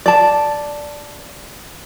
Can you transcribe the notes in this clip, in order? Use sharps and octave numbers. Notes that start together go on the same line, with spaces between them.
D5 A5